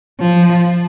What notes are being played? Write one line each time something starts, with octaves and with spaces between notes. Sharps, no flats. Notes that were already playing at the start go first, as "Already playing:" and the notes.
F3